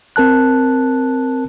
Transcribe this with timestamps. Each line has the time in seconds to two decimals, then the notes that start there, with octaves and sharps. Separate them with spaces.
0.16 C4 A#4 A5 F#6